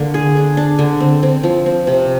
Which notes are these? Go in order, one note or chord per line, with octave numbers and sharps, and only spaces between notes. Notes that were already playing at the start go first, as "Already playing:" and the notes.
Already playing: D3 A#3
G#4
D4
D4
D3
C4
C4
F3
C4
C3